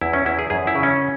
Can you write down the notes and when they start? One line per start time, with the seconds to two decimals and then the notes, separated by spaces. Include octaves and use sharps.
0.01 E2 E4
0.13 C#4
0.25 E2 E4
0.39 G#4
0.50 F#2 G#4
0.67 E4
0.75 C#3
0.83 C#4